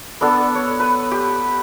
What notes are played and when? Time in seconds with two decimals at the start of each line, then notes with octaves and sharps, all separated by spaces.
0.21 B3 D4 A4
0.55 C#5
0.80 B4
1.11 G4